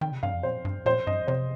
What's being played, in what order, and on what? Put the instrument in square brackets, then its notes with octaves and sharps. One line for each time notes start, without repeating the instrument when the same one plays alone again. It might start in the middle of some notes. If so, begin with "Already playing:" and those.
[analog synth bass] D#3 [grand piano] G5
[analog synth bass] C3
[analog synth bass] G2 [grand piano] F5
[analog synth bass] F2
[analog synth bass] A#2 [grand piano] C5
[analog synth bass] G2
[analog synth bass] A#2 [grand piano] C5
[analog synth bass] G2 [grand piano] D#5
[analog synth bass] C3 [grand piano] C5